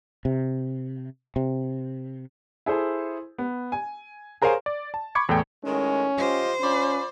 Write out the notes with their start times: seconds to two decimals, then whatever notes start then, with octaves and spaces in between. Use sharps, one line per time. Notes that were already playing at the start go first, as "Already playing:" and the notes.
0.25 C3
1.36 C3
2.66 E4 G#4 A4 C5
3.38 B3
3.72 G#5
4.42 G#4 A#4 C5 C#5 F5 G#5
4.66 D5
4.94 A5
5.15 B5 C#6 D6 G#6 C#7
5.29 E2 A2 A3 G5
5.65 A2 D#3 G#3 C#4
6.18 F4 G4 C5 D#5
6.60 C#4 F4 D5 B5